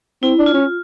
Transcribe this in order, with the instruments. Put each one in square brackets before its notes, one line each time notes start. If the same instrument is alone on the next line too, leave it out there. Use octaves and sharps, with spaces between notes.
[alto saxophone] C4 [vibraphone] E4
[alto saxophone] D4
[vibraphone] F4
[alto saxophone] C#4